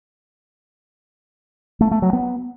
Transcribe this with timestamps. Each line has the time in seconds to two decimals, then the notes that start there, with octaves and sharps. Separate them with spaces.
1.81 A3
1.91 A3
2.02 F#3
2.13 B3